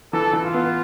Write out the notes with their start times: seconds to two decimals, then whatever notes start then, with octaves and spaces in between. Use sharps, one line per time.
0.13 E3 A4
0.33 E3
0.44 F4
0.54 B3